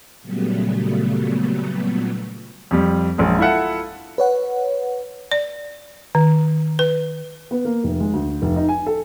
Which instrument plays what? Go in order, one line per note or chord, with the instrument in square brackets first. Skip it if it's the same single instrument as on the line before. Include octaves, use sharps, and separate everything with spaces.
[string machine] A#2 C#3 F#3 G3 A3 B3
[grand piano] F2 G3
A#1 F#2 G#3
E4 F4 A4 E5 F#5
[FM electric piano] B4 C#5 F#5
[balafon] D5
D#3
B4
[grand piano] B3
A#3
F1
G#3
D2
F1
D#4
G#5
A4